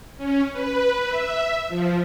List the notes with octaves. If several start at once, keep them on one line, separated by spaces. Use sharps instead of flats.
C#4
B4
E5
F3